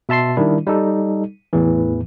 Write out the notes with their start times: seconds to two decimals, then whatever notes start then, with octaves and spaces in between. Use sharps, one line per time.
0.09 B2 E5 A5 C6 C7
0.37 D#3 G3 D4 E4
0.67 G3 D#4 A4
1.53 E2 A2 E3